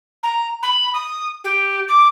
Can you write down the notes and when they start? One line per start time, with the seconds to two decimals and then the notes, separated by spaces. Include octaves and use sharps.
0.23 A#5
0.62 B5
0.94 D#6
1.44 G4
1.88 D6